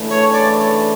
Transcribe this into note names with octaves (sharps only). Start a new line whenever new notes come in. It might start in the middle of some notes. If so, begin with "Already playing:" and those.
Already playing: C#3 E3 A3 D4
C#5
D5